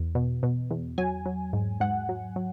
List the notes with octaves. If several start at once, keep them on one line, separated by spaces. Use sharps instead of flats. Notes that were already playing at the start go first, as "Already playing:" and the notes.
Already playing: E2
B2
B2
E2
F#3 G#5
F#3
G#2
G#2 F#5
F#3
F#3